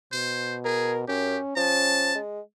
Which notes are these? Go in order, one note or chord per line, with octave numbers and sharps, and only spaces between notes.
B2 C5
G#4 A#4
F#2 C#4 G4
F3 C#4 A5
G#3